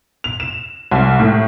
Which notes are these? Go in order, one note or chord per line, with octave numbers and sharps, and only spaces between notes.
F7
E7
C2
A2